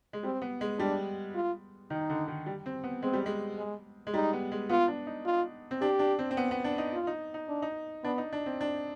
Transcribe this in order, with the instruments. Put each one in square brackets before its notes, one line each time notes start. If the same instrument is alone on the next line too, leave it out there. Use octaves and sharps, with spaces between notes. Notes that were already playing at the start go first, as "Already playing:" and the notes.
[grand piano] G#3
[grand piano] G3 [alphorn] C4
[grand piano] B3
G#3
[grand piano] G3 [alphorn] D4
[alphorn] F4
[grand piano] D#3 [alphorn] D#4
[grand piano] D3
D#3
G3
C4
B3
[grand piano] G#3 [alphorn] C4
[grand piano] G3
G#3
[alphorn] G#3
[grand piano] G#3
[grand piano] G3 [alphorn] D#4
[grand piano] B3
G#3
[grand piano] B3 [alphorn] F4
[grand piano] D4
D#4
[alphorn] F4
[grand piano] C4
[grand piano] D4 [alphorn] G4
[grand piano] D4
C4
C4
B3
B3
D4
D#4
[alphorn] F4
[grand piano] D#4
D#4
[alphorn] D4
[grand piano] D#4
[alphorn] B3 [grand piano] D4
[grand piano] D#4
D4
C4
D4